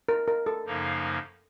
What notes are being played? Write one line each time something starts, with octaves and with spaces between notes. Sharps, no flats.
A#4
A#4
A4
F#2 C#3 F3 A#3 D#4